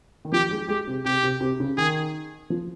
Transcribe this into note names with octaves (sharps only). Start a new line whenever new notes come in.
D#3
F3 G4
G#3
G#3 G4
C3
C3 G4
C3
C3
C#3
D#3 G#4
F3